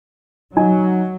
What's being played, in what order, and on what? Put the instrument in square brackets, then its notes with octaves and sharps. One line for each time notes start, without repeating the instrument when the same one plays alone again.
[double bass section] F#3 [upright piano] D#4 D#5 G#5